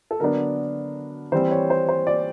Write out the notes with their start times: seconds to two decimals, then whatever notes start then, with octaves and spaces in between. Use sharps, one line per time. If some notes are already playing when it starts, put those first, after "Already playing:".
0.11 A4
0.20 D3 F#3 B3 D4 A#4
1.32 E3 G3 C4 C5
1.51 C#5
1.70 C5
1.89 C5
2.07 D5